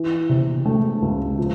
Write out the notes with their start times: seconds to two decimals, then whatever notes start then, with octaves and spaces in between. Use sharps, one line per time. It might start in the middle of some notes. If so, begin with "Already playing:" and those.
Already playing: E3
0.29 C3
0.66 A3
1.02 C#2
1.39 F3